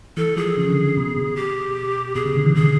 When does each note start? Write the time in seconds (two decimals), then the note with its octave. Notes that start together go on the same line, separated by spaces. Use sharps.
0.17 E3 A4
0.37 F3 G#4
0.57 C#3
0.70 D3
0.97 B2
1.17 B2
1.36 G4
2.15 B2 G#4
2.25 C#3
2.36 D3
2.45 E3
2.54 D#3 G#4
2.61 D3